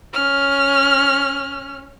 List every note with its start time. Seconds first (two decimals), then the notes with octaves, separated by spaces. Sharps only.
0.14 C#4 F6